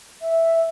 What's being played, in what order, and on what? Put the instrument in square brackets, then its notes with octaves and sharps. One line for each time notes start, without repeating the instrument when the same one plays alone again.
[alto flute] E5